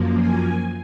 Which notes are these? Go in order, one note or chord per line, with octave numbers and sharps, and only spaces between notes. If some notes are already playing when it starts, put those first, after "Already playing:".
Already playing: F#2 F3 A#3
G#5